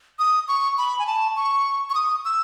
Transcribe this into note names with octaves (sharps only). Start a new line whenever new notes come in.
D#6
C#6
B5
G#5
A5
C#6
C#6
D#6
E6